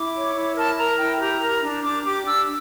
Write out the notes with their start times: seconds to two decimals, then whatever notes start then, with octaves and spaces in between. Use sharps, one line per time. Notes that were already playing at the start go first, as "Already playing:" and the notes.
Already playing: E4 D6
0.14 C#5
0.35 E4
0.56 A#4 A5
0.78 A#4 A#5
0.98 E4 G5
1.20 G4 A#5
1.41 A#4
1.62 D4
1.84 D4 D6
2.05 G4 D6
2.26 D4 E6